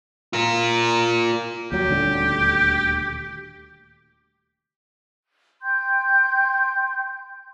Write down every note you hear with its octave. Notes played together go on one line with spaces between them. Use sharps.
F4 A#4
D#2 F#3 G4
D#1 D2 D3
G5 C6 G6